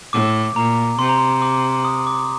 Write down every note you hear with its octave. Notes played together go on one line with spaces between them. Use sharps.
A2 D6
A#2 A#5
C3 C6
A#5
C6
D6
D#6
D6